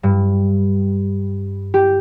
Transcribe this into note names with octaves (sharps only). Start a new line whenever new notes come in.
G2
G4